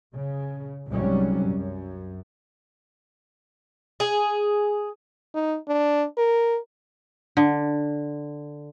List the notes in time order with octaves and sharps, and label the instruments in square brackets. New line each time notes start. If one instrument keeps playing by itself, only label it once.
[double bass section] C#3
C2 G#2 F#3 G3 C#4
F#2
[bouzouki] G#4
[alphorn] D#4
D4
A#4
[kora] D3